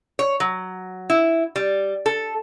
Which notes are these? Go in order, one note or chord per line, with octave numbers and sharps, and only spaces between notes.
C#5
F#3
E4
G3
A4